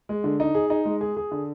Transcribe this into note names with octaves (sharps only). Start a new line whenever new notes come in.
G#3
D3
D#4
G#4
D#4
G#3
G#4
G#4
D3